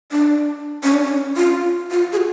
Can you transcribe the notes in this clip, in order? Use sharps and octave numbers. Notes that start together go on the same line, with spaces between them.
D4
C#4
D4
C#4
F4
F4
G#4
F#4